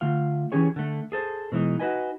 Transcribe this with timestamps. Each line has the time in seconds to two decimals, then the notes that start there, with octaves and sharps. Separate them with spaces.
0.01 D3 A3 F4 F5
0.52 E3 G3 C#4 G4 G#4 C#5
0.76 D3 A3
1.12 G#4 A4 C5
1.52 B2 E3 G#3 D#4
1.80 D#4 F#4 A4 B4 D#5 G#5